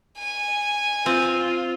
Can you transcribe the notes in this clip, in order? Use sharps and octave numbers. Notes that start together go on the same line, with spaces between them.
G#5
C4 F4